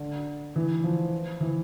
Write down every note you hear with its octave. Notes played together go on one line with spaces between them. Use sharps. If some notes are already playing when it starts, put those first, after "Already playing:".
Already playing: D3
E3
F3
E3